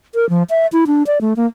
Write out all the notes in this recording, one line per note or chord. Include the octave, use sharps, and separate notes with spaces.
A#4
F3
E5
E4
D4
D5
A3
A#3